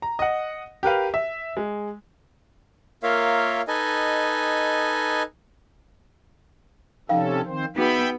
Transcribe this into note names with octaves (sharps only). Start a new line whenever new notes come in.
A#5
D#5 F#5
G4 A#4 B4 F5
E5
G#3
A#3 F4 A#4 C#5 E5 F5
D#4 A4 B4 D#5 G#5
C3 F3 C#4 D#4 A4 F5 G5
D#3 C4 C5
B3 D#4 F#4 G#4 E5 G5 B5